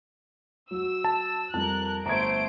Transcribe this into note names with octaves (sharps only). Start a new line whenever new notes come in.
F#3 F#4 E6
A5
F2 G3 A#4 A5 F#6
G1 A3 C5 A#5 G#6 D7